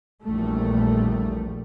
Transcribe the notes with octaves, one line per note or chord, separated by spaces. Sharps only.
A#1 E2 G3 A3